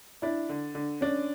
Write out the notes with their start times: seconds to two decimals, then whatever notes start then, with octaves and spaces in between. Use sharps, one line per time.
0.22 D4 E4
0.49 D3
0.75 D3
1.01 C#4 D4